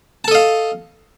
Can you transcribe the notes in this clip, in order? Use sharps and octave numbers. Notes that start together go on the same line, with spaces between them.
A4 D#5 F5 A5